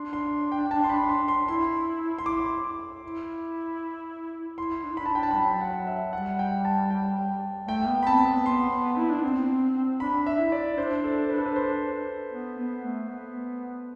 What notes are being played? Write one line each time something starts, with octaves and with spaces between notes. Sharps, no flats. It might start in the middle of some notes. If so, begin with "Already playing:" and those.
Already playing: D4 C6
C6
G5
A5
C6
B5
C6
C6
E4 C6
C6
E4 D6
E4
E4 C6
D4
E4
D4 B5
A5
D4
G5
A5
B5
F#3 A5
F#5
E5
G3 F#5
G5
A5
G5
A3 G5
B3
B5
C4 A5
B3
B3 C6
E4
D4
C4
D4 B5
E5
E4
D5
D4 C5
A4
B4
A4
B4
C5
B3
B3
A3
B3